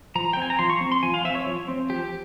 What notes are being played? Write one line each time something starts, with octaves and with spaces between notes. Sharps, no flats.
F3 A#5
G5
C4 G#5
A#5
F3 C6
C#6
C4
C6
F3 G#5
F5
C4 E5
C#5
F3
C4
F3 G4